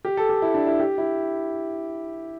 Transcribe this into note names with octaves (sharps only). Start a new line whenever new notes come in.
G4
A4
G4
E4
D4
E4
G4
E4